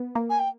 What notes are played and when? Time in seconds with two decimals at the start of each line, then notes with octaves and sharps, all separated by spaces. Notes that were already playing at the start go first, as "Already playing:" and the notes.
Already playing: B3
0.15 A#3
0.30 G#5
0.39 G5